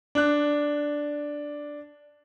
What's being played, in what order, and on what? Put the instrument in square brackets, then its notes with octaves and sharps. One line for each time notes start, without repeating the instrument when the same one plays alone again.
[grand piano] D4 F#6